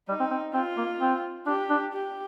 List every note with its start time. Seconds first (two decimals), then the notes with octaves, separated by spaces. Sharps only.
0.09 G3 D#4
0.20 C4
0.31 C4
0.54 C4 F4
0.77 A#3
1.00 C4
1.46 D4 G4
1.70 D4
1.93 G4